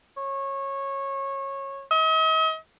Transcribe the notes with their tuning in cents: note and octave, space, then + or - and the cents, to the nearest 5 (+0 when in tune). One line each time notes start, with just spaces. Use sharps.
C#5 -20
D#5 +45